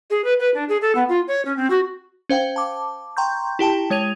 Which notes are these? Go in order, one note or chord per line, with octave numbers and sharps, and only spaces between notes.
G#4
B4
B4
D4
G#4
A4
B3
F4
C#5
C#4
C4
F#4
C#4 C5 F5 G5
A5 D6
G5 A#5 C6 C#6 G6
E4 G4 G5 A5
G#3 C#5 G#6 D#7 F7